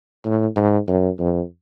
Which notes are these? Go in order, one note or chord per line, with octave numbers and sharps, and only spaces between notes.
A2
G#2
F#2
F2